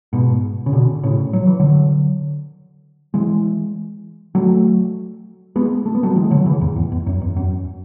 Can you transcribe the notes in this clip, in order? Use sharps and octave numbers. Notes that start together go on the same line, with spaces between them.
G#2 B2
C#3
B2 D3
A2 C#3
F#3
E3
D3 F#3
E3 G#3
F#3 A3
G#3 B3
A3
B3
F#3 A3
E3 G#3
D3 F#3
C#3 E3
E2 G#2
E2
E2
F#2
E2
F#2